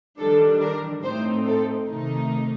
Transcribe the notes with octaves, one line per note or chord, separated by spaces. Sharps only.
D#3 G3 D4 A4
A#4
A2 A3 C4 D#4 C5
A4
C3 D#3 A3 D#4